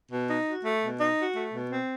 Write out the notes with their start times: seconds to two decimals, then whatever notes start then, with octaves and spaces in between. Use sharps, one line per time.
0.11 B2
0.29 D#4
0.47 F#4
0.65 A3
0.83 B2
1.01 D#4
1.19 F#4
1.36 A3
1.54 B2
1.72 C4